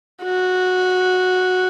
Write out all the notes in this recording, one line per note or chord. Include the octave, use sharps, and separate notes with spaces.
F#4